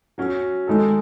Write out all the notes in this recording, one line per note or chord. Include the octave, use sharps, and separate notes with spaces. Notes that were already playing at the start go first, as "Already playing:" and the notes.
F#3 C#4 F#4
D#3 G#3 D#4 A4